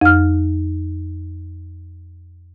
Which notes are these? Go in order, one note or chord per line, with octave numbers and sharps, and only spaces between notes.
F2 F6